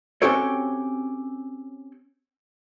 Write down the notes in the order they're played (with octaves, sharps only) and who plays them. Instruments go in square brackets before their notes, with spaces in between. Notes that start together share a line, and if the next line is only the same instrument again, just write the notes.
[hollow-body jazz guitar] C4 C#4 F#4 G4 A4 C#5